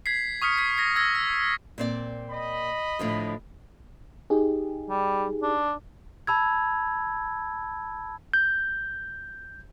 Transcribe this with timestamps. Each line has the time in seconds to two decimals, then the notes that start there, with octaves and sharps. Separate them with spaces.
0.06 G#6 B6 C7
0.42 C#6 D#6 F6 B6 C#7
0.58 G#6 B6
0.78 G#6 A#6
0.96 E6 G#6 A#6
1.15 E6
1.78 A#2 C4 D5
2.31 D#5 B5
2.99 A2 D3 F3
4.30 D#4 G4 G#4
4.90 G3
5.42 D4
6.27 A5 B5 E6 G#6
8.34 G6